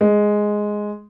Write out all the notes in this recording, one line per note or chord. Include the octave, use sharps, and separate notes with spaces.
G#3